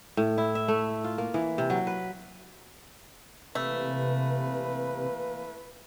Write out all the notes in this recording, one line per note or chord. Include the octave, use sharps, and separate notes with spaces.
A2
E4
E5
A3
F4
A#3
E3
C3
F#3
B4
C3 E3 A3 A#3 B4